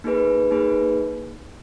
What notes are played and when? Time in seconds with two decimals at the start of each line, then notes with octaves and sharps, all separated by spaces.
0.04 A#3 D#4 G#4 B4
0.51 A#3 D#4 G#4 B4